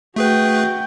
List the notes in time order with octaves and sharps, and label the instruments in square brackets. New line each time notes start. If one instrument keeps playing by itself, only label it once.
[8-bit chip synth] A3 G#4 B4 [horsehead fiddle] F#4 G5